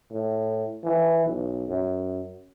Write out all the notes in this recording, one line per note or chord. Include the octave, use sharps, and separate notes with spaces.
A2
E3
B1
F#2